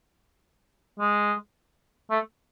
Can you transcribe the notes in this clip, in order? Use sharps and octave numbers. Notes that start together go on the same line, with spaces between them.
G#3
A3